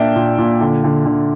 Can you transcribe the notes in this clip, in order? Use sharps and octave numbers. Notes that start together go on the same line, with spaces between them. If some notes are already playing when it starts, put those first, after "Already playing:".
Already playing: A#2 A#3 D4 E5 G5
A#2
A#2
D3
D3
D3